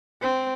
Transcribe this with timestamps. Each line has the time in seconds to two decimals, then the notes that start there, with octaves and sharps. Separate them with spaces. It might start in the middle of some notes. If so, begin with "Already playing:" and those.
0.22 C4